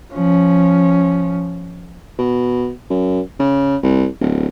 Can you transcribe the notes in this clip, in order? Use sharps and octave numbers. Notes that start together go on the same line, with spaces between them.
F3 C#4
B2
F#2
C#3
C2
D1